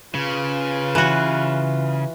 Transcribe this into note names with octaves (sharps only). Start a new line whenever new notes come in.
C#3 F4 B4
E3 F#4